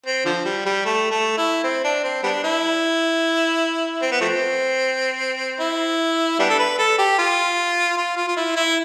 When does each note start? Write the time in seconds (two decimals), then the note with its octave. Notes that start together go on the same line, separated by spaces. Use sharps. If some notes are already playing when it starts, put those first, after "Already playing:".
0.06 C4
0.25 D3 F3
0.45 G3
0.66 G3
0.85 A3
1.11 A3
1.37 E4
1.64 C4
1.85 D4
2.04 C4
2.23 G3 B3 D4
2.44 E4
4.02 C4
4.11 B3
4.21 F3 A3 C4
5.60 E4
6.39 G3 B3 D4
6.49 A4
6.59 B4
6.79 A4
6.98 G4
7.18 F4
7.97 F4
8.16 F4
8.27 F4
8.37 E4
8.56 E4